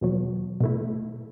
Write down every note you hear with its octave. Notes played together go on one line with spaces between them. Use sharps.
E2 B2 F#3
B2 A3 E4